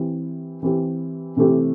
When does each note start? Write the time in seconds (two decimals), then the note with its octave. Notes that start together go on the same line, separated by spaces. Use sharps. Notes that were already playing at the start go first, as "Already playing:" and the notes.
Already playing: E3 C4 G4
0.63 E3 C4 G4
1.37 C3 E3 A3 C4 G4